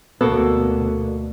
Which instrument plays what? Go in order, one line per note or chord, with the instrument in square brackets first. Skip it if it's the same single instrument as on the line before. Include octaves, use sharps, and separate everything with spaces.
[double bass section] D2 B2 [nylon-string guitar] A#3 F#4 A4 [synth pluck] B3